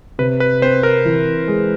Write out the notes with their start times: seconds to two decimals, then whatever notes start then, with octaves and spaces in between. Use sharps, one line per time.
0.19 C3 B4
0.40 B4
0.62 C4 C5
0.83 A#4
1.05 E3
1.48 G#3